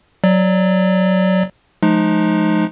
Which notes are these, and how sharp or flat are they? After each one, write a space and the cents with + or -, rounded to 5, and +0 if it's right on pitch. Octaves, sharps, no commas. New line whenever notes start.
F#3 +0 D5 +15
F3 +0 G#3 +30 D#4 -15